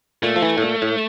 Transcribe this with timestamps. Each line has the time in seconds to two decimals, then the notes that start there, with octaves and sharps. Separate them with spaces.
0.23 A#2 A3
0.36 F3
0.42 E3
0.58 A2
0.62 A#2
0.82 A2